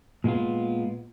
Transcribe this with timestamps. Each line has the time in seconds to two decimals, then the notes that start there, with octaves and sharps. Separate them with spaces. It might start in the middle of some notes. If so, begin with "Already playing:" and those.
0.24 A#2 G#3 B3 F4